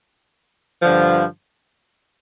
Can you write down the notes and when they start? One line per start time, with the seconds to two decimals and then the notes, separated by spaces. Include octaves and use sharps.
0.82 G2 D3 F3